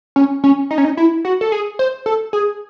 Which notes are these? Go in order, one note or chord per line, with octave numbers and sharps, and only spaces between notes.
C#4
C#4
D#4
C#4
D#4
E4
F#4
A4
G#4
C5
A4
G#4